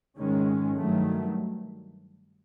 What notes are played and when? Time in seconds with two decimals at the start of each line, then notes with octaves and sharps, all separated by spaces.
0.17 G#2 D#3 G#3 C#4
0.77 G2 D#3 F#3 A3